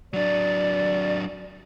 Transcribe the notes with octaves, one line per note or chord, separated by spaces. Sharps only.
F#3 D4 D5